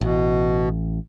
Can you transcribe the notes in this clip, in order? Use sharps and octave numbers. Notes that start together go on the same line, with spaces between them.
A1 B2